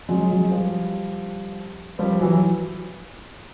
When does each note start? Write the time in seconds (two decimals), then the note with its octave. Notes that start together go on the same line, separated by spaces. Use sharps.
0.09 F#3 G#3
0.30 F#3 G#3
0.51 F3 G3
1.99 F3 G3
2.20 E3 F#3